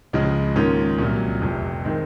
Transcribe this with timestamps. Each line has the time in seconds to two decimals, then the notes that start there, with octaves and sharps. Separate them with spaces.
0.13 C#2 C#3 F3 G#3
0.55 G#2 D#3 A#3 C#4 F4
0.98 C2 A#2 F#3
1.41 F1 F2 C3 F3
1.84 D#3 G#3 C4